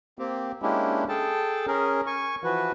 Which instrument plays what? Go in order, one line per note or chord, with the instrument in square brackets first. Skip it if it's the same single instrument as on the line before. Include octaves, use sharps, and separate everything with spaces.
[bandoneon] A#3 C4 G4
G#3 A#3 C#4 D4 E4 G4
G#4 A4 G5 A5
C#4 G#4 A#4
G#5 C#6
E3 F3 F#4 B4